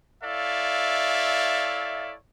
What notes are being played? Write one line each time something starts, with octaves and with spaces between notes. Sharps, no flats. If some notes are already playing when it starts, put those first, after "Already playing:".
E4 A4 C#5 D5 E5 F5